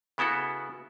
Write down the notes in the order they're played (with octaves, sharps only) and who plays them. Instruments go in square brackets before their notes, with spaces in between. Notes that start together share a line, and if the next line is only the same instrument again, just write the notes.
[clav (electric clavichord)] C#3 B3 E4 F#4 A4